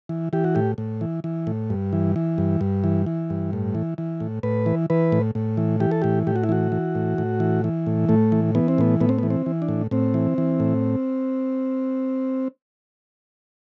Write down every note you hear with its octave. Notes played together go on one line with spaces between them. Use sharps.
E3
E3 G4
F#4
A2 G4
A2
E3
E3
A2
G2
E3
E3
G2
G2
E3
E3
G2
A2
E3
E3
A2
A2 B4
E3
E3 B4
A2
A2
E3
E3 G4
A4
A2 G4
A2 G4
F#4
E4
E3 F#4
E3
A2
A2
E3
E3
A2
A2 A3
E3
E3 B3
C4
A2 B3
A2 B3
C4
B3
E3
C4
E3
D4
A2
A2 C4
E3
E3
A2